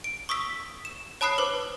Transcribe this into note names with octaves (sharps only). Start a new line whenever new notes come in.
D7
C#6 D#6 E6 B6
E7
C#5 A5 B5 D#6 F#6 C7
B4 C5 D6